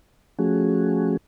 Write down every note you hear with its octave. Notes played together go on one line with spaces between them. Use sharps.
F3 A3 C#4 F#4 G#4